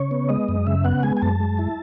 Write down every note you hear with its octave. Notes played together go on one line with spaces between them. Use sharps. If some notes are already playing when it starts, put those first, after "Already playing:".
Already playing: C#3 C#5
B3
G#3 D#5
F#2
C#3 E5
B3 F#5
G#3 G#5
G#5
F#2 A5
G#3
E4